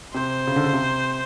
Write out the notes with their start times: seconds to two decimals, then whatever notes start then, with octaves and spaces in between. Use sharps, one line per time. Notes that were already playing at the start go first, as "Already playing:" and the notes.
0.14 C3 C5
0.47 C#3
0.56 D3
0.64 C#3
0.73 C3